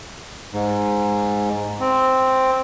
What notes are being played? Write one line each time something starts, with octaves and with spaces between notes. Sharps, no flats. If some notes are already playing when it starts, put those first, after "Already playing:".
G#2
C4